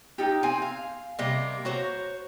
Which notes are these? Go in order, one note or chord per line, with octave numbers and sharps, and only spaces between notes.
D#4 F4 G4
C4 G#5
F5
C3 G3 A#3 D#5
F#4 C5 C#5 A#5